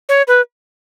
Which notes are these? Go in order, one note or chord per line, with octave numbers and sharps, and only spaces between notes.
C#5
B4